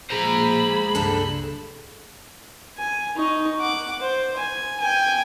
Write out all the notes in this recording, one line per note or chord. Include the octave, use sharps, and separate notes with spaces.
F3 G#3 A#3 G#4 C5 A#5 B5
C#2 G2 C#3 D4 A4
G#5
D#4 C#6
F#5 D6
C5
G#5
G5 G#5